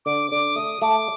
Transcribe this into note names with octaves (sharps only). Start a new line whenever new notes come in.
D3 D6
D3 D6
A3 D#6
A3 D6